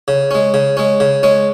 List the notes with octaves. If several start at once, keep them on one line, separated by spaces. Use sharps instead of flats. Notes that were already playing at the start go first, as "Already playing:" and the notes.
C#3
G#3 C#4
C#3
G#3 C#4
C#3
G#3 C#4